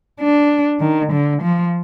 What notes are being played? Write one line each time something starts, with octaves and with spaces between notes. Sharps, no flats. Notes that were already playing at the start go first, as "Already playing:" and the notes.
D4
D#3
D3
F3